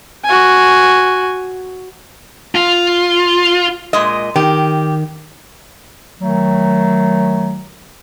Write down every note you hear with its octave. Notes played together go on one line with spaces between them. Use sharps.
F#4 G#5
F4
A#2 G#3 D#5
D#3 G4
D#3 F#3 A3